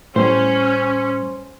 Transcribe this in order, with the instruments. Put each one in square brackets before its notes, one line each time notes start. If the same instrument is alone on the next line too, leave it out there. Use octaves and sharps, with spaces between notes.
[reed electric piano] A2 G3 [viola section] C#4 [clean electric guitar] C5